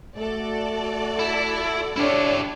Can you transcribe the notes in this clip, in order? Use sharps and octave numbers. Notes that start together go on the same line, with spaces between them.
A3 F#4 A4 D5
E4
D4 E4 G4 C#5